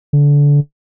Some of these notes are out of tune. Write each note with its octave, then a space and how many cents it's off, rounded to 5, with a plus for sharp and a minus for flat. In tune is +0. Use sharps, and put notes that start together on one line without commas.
D3 -25